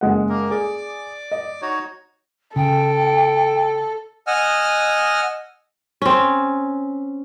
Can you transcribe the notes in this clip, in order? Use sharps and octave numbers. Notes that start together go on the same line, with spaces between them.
F#1 G#3 F#5
A#3 A#4
G#4 D5 D6
D#5
D#4 F#4 C#5
C#3 A4 G5
D#5 F#5 G#5 E6 F6
C4 C#4